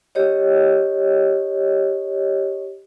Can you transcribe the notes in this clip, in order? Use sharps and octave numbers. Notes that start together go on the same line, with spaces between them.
G4 C#5 D#5